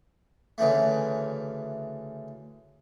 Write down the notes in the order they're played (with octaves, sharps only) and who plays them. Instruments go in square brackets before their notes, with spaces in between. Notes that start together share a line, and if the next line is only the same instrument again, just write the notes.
[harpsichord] D2 C#3 E3 A3